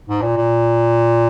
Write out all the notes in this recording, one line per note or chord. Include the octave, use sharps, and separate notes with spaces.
G#2
A#2
A#2